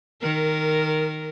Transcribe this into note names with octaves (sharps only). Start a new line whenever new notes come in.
D#3 A#4